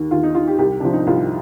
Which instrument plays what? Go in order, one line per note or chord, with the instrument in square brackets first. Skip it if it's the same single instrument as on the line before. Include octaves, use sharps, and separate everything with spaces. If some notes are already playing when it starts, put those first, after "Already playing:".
Already playing: [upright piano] D#2 D#3
D#2 F4
D#4
D#3 F4
G4
C2 G4
C3 F3 D4
D#4
C2 F4